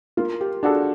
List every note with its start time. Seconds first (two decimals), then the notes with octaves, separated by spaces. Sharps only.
0.17 A#3 F4
0.41 G4
0.63 D4 F#4 G#4 A4